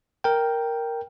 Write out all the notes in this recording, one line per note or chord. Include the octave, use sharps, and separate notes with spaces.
A#4 G5